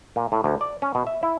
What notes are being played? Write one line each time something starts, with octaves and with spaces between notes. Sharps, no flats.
A#2
A2
D2
D5
C#4
B2
E5
E4